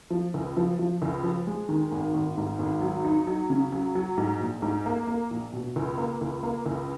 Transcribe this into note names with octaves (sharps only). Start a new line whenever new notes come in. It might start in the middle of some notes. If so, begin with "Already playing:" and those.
F3
C#2
F3
F3
C#2
F3
G#3
D#3
G#1
G#1
G#2
G#1
F#3
D#4
F#3
C#3
F#3
F#3
G#2
A#1
G#2
A#3
A#3
A#1
B2
C#2
A#3
C#2
A#3
C#2